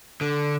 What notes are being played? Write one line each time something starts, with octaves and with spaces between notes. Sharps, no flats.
D3